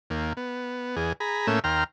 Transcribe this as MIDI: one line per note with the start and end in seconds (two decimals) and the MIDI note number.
0.10 0.33 39
0.10 0.33 58
0.37 0.96 59
0.96 1.13 40
0.96 1.13 68
1.20 1.47 68
1.20 1.47 82
1.20 1.47 83
1.47 1.59 45
1.47 1.59 57
1.47 1.59 58
1.47 1.59 61
1.47 1.59 88
1.64 1.84 39
1.64 1.84 79
1.64 1.84 82
1.64 1.84 84
1.64 1.84 89